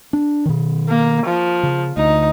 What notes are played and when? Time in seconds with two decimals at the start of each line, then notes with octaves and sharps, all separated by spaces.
0.13 D4
0.46 B2 D#3
0.89 A#3
1.26 F3
1.63 C#3
1.97 D2 D#4